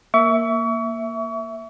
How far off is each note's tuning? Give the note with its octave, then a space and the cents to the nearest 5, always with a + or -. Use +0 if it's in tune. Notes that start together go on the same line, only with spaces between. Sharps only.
A#3 +0 E5 +0 C#6 +35